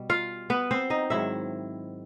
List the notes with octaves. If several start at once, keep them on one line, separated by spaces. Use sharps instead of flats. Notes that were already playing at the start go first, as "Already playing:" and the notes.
Already playing: B2 G3
F4 F5
B3 B4
C4 C5
D#4 D#5
G#2 D#3 F#3 E4 E5